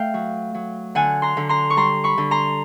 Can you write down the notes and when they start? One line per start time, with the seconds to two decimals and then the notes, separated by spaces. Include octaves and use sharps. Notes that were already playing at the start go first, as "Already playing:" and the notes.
Already playing: A3 F5 G5
0.14 F#3
0.55 F#3
0.95 D3 F#5 G#5
1.22 A#5 C6
1.37 D3
1.49 A#5 C6
1.70 C#6
1.77 G3 A#5 C6
2.04 B5 C#6
2.18 D3
2.31 A#5 C6